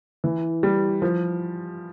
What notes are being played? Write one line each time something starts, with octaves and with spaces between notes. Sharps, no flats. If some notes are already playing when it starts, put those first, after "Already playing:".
E3
G3
F3